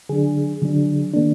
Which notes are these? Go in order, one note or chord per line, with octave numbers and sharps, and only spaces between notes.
D3 F#3 D4 G#4
D3 F#3 D4
D#3 A#3 D4